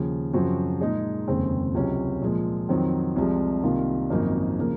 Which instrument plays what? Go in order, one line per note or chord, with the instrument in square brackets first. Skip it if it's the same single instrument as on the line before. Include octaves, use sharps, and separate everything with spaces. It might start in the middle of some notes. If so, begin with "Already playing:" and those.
Already playing: [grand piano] D#2 C#3 F3
F#2 C#3 F3 C4 F#4
A#2 G#3 D#4 G#4
F1 D#2 C#3 G#3 C4
C#2 C3 F#3 C#4
A#2 F3 G#3
F2 D#3 F#3 C4
C2 C3 F3 G#3
C2 C3 D#3 A#3 F4
G#1 F#2 F3 A#3 D#4
C#3 F3 A#3